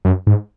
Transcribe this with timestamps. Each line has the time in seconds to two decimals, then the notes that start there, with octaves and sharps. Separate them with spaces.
0.05 F#2
0.27 G#2